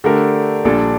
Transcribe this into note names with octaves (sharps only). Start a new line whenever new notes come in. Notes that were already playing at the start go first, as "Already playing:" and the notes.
D3 A3 D4 G4 A#4
A#1 A#2 G3 D4 A4